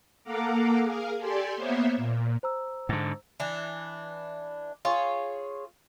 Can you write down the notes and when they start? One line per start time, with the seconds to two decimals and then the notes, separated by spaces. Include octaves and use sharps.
0.24 A#3 A4 F5 F#5 A#5 D6
0.82 G#4 A#4 F5
1.17 G4 A4 D5 G#5 C6
1.57 A#3 B3 C5 C#5 E5
1.96 A#2
2.43 C5 A#5 E6
2.89 G#2 D3
3.40 E3 D4
4.85 F4 G#4 C#5